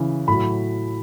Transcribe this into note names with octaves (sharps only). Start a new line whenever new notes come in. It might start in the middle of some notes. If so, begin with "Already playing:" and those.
Already playing: C#3 E3
A2 F#3 B5